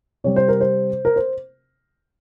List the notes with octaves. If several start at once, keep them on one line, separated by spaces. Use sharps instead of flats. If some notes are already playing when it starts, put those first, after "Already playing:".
C3 G3 C4 C#5
C5
A#4
C5
A#4
C5